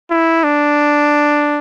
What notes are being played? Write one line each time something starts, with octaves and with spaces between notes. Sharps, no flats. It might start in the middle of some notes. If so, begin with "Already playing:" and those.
E4
D4